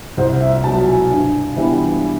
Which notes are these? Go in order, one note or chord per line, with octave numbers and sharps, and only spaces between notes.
C2 C5
E5
B2 F#3 A5
G#5
G2
E3 G3 B3